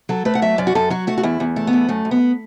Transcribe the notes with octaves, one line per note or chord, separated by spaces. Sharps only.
F#3 A4
A3 B4
F#5
F#3 E5
F#2 D5
F#4
F#2 A4
F#3 F#4
A3 F#4
F#4
E2 E4
E2
A3
B3
E2
F#2 A3
F#2
B3